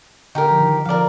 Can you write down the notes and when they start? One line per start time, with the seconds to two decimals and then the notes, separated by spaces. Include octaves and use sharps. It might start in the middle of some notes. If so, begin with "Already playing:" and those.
0.35 D3 D#4 G4 A#4
0.51 F3
0.60 D#3
0.85 F3 A#4 D5 F5